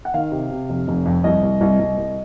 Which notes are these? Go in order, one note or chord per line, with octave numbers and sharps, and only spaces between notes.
F#5
D#3 F5
C3
C3
F1
F1
F2
C2 D#5
C2
C2
C2
C2